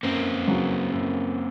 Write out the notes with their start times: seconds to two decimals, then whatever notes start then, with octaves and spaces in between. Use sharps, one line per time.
0.03 F#2 A#3 C4
0.48 C#3 F#3
0.92 F#2